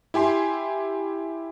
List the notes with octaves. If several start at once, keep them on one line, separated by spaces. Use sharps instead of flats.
E4 G4 G#5 C6